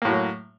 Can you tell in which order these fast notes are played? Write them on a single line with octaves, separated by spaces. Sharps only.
A#3 A2 F#3